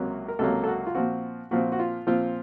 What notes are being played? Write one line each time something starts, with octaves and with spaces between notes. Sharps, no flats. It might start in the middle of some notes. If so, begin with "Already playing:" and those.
Already playing: C#2 C3 F#3 A#3
A#4
C#2 C3 F#3 A#3 A4
A4
F#4
F4
A#2 F3 C4 F#4
A#2 F3 C4 F#4
F#4
F4
A#2 F3 C4 F4